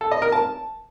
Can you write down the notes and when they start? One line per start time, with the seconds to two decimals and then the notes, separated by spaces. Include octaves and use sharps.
0.01 A4
0.11 D#5
0.22 A#4
0.32 A5